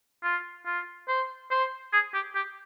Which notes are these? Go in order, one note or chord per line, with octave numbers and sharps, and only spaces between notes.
F4
F4
C5
C5
G#4
G4
G4